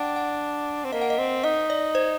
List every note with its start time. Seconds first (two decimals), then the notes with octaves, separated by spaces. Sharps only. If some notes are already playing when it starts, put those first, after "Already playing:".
Already playing: D4 F#5 G5
0.16 F#5
0.84 C4
0.92 A#3 D#5
1.01 F#5
1.10 D#5
1.18 C4
1.44 D#4 D#5
1.70 D5
1.95 C5